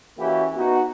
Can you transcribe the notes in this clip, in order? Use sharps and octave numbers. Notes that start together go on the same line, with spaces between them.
E3 A#3 C#4 E4 F#4 G4
B3 D#4 F#4